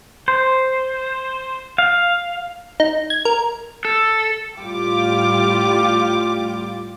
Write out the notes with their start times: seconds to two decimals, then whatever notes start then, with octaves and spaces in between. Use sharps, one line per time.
0.28 C5
1.78 F5
2.80 D#4
3.10 G#6
3.25 A#4
3.85 A4
4.60 A2 G3 F4 G4 D6